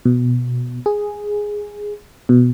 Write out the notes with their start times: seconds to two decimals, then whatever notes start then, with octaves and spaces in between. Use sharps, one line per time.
0.05 B2
0.86 G#4
2.29 B2